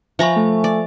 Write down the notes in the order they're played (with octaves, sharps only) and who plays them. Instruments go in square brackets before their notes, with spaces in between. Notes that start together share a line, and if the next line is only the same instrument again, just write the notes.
[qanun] F3 A#5 B5 [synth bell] E5 G#5 C#6
[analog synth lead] A3
[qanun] D5